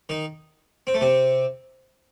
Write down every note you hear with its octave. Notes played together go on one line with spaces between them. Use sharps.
D#3 D#4
C4
A3
C3 C4